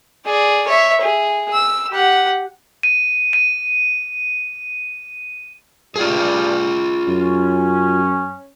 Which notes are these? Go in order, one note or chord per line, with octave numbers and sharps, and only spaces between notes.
G#4 D5
C#5 E5
G#4
E6
G4 F#5
D#7
D#7
G2 F4 G#4
F#2 C#4